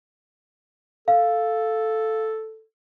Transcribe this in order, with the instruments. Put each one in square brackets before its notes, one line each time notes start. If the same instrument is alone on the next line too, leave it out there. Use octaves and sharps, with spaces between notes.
[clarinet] A4 [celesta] F5